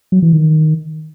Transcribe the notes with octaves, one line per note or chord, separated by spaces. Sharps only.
F#3
E3
D#3